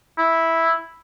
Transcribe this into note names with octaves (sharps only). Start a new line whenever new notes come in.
E4